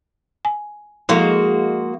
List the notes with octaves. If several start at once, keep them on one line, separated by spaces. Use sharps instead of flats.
G#5
F3 G#3 A#3 E4 F#4 A4